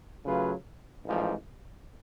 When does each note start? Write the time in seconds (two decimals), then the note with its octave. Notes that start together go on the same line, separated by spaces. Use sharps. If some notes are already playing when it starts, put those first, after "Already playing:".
0.24 C#3 F#3 A3 F4 B4
1.05 A1 G#2 F3